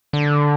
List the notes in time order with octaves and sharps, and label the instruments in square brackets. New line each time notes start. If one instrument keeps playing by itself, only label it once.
[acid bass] D3